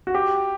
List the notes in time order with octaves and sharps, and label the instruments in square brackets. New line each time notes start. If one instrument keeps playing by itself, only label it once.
[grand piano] F#4
G4